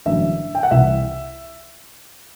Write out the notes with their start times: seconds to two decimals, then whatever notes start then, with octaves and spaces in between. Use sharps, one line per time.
0.06 A1 G2 D3 F#3 E5
0.55 G5
0.63 F#5
0.71 C2 C3 E3 E5